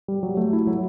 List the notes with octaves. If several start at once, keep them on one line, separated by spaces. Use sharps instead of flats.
G3
F#3
A3
E4
F#3